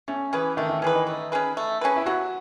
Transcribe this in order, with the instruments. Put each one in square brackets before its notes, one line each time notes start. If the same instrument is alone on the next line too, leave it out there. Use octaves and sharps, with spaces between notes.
[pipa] A3 [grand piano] C#4
[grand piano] E3 [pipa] C#4 G#4 B4
[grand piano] D#3 [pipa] A3
[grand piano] D#3
[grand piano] E3 [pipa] C#4 G#4 B4
[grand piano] D#4
[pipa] A3
C#4 G#4 B4
A3
C#4 G#4 B4
[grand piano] E4
[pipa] F#3 [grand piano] F#4